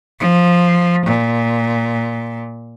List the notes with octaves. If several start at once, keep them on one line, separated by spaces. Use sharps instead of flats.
F3
A#2